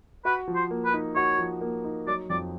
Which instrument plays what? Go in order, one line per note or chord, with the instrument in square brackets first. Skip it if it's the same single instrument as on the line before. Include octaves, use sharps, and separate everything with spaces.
[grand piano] F#4 [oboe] B4
[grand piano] F3
[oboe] C5
[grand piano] A#3
[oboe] B4
[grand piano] D#4
[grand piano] F#4 [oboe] C#5
[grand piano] F3
A#3
D#4
[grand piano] F#3 [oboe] D5
[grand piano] F2 [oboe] D5